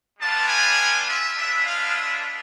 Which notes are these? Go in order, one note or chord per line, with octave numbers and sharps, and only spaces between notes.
G3 B3 D4 F4 A5
G#5
E5
G#3 B3 D4 F4 E5
F5
E5